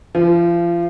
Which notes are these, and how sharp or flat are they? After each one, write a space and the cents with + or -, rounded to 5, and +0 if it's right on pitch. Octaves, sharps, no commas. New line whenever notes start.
F3 -30